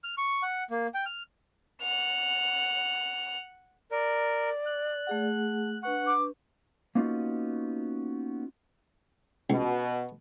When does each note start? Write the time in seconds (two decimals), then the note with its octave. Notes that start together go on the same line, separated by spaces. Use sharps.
0.04 F6
0.18 C#6
0.43 F#5
0.70 A#3
0.94 G5
1.06 F6
1.81 F#5 F7
3.91 A#4 D5
4.66 F#6
5.07 A3 G#4 F#5
5.83 D4 B4 F#5 C#6
6.07 D6
6.95 A#3 B3 C#4 D#4 F4 F#4
9.50 C#2 B2